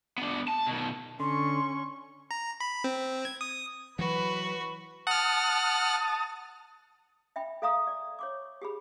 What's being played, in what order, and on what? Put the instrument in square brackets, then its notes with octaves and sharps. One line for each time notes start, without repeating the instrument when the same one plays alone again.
[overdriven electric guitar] B3 D4
A5
B2 D#3
[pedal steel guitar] D3 [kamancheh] C#4 C#6 [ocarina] C6
[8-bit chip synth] A#5
B5
C4
G#6
D#6
[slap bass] E3 F#3 [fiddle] F#4 [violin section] B4
[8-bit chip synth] F#5 F6 [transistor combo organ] A5 D#6
[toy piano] E5 G5 B5
A4 E5 F5 A#5 C#6 D#6
D5
C#5 C#6 D6
G4 G#4 B5